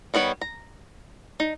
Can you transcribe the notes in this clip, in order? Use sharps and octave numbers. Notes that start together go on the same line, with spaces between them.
D#3 G3 B3 C#5
A#5
D#4